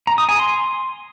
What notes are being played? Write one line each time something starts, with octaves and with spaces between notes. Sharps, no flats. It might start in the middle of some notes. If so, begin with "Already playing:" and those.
A#5
D#6
G#5
C6